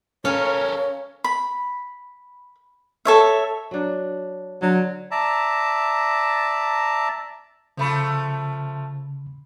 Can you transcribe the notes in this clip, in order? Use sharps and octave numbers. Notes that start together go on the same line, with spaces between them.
C#4 A4 A#4 C#5 F5 G#5
B5
A4 C#5 E5
F#3 D4
D3 F#3
D5 E5 A5 A#5
C#3 F3 A3 F4 B5